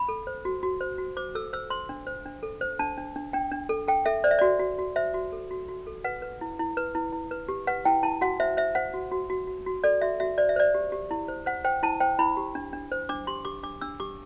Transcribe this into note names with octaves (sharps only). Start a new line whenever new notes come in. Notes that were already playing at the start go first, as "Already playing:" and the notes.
Already playing: B5
A4
C5
F#4
F#4
C5
F#4
C5 D6
A4 E6
C5 E6
C5 C6
D4
C5
D4
A4
C5
D4 A5
D4
D4
D4 G5
D4
A4
A4 G5
A4 E5
C5 D5
E5
F#4 D5
F#4
F#4
C5 E5
F#4
A4
F#4
F#4
A4
B4 F#5
B4
E4
E4
B4
E4
E4
B4
G4
B4 F#5
E4 G5
E4 A5
F#4 F#5
C5 E5
C5 E5
C5 F#5
F#4
F#4
F#4
F#4
F#4
A4 D5
F#4 E5
F#4 E5
C5 D5
E5
C5 D5
G4
G4
E4
C5
C5 F#5
C5 G5
E4 A5
C5 G5
E4 B5
G4
D4
D4
C5
D4 D6
G4 C6
G4 D6
D4 D6
D4 E6
G4 D6